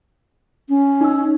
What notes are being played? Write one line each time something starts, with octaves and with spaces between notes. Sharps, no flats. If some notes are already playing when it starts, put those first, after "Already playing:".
C#4
D#4 E6